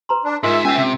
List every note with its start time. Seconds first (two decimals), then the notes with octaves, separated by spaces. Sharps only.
0.09 B4 A#5 C6
0.25 D4
0.43 G#2 G#3 F4 A#4 E5 C6
0.65 C#4 C5 G#5
0.77 C3